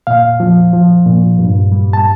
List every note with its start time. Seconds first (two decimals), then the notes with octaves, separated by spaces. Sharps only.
0.07 A#2 F5
0.40 F3
0.73 F3
1.06 A#2
1.39 G2
1.72 G3
1.93 A5